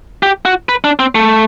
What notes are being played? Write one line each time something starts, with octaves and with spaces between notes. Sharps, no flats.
G4
F#4
B4
D4
C4
A3